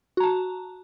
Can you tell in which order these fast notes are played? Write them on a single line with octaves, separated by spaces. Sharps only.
F#4 A#5 A5